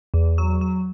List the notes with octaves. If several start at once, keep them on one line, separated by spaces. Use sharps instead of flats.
E2
F#3
F#3